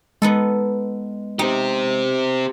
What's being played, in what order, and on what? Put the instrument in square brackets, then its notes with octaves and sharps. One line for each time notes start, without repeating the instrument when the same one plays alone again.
[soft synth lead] G#3 [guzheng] B3 D#4 A4
[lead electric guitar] C4 G4 [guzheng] D#4